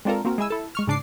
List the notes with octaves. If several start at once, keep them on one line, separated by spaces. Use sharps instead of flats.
G#3 C4 D4 F4 A4 A#4
A#3 C4 F#4 A#4
G#3 E4 G#5 E6
E4 A4
G#3 C#6 F6
G#2 C#3 D4 D6 C7